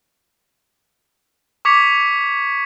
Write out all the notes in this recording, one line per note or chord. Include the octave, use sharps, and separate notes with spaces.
C#6 D6 G#6 B6 C#7 F7